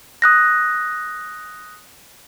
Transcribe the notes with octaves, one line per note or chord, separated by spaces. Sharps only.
D#6 F#6 A#6